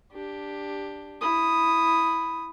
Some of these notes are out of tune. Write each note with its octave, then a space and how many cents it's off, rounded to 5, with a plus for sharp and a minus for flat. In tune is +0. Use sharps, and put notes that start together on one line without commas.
D4 +0 G4 +10
E4 +0 D#6 +0